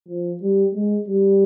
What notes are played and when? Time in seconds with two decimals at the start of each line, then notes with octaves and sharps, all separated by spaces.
0.09 F3
0.43 G3
0.75 G#3
1.08 G3